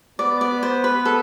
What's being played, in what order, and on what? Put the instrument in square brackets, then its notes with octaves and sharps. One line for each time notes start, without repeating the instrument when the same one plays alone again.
[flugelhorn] B3 [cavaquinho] D5
[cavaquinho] D5
C5
B4
A4